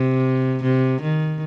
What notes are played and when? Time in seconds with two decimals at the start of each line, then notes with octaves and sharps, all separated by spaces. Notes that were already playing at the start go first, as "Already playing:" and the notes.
Already playing: C3
0.63 C3
1.01 D#3